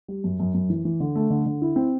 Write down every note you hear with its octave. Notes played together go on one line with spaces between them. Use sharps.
G3
F#2
F#2
F#2
E3
E3
D3
A3
D3
D3
E4
C4